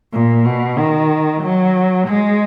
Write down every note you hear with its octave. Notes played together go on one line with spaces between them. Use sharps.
A#2
B2
D#3
F#3
G#3